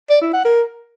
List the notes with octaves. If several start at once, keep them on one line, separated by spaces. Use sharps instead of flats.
D5
E4
F#5
A#4